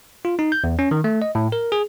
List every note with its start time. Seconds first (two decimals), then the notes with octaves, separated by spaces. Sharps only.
0.25 F4
0.39 D#4
0.52 G6
0.64 E2
0.79 C#4
0.91 D#3
1.04 A3
1.22 D#5
1.35 A2
1.52 A#4
1.72 G#4